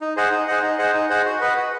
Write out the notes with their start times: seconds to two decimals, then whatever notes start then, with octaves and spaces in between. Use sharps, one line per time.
0.01 D#4
0.16 G#4 C5 D#5 F#5
0.31 D#4
0.48 G#4 C5 D#5 F#5
0.63 D#4
0.78 G#4 C5 D#5 F#5
0.94 D#4
1.09 G#4 C5 D#5 F#5
1.26 F#4
1.41 B4 D#5 F#5
1.56 F#4